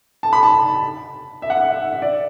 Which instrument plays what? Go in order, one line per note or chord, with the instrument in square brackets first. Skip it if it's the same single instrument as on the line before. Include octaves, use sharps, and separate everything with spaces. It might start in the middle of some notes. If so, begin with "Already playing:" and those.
[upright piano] A5
B5
A5
E5
F#5
E5
F#5
E5
E5
D5